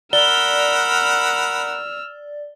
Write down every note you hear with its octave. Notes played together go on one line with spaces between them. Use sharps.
A#4 D5 F#5 B5 E6 F6 G7